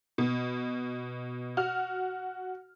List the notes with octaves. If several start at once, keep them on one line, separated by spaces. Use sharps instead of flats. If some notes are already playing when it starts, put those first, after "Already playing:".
B2
F#4 F6